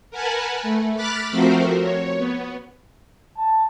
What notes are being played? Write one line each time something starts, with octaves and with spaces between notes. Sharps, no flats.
A#4 B4 F#5 G#5 A5 B5
A3
B5 D6 F6 F#6 A6 B6
F3 A3 C4 F#4 A#4 C5
C#5
B3
A5